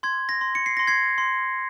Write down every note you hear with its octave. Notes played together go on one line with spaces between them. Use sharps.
C6 G#6
A#6
C6
C#7
C7
C6 A#6
G#6 C7
C6